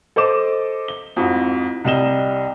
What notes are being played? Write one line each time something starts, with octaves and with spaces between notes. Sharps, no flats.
A4 C5 D#5 D6 E7
G7
F2 G#2 E4 F#4
C2 G3 D#5 E7 G7